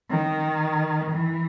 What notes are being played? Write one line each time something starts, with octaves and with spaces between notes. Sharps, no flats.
D#3
E3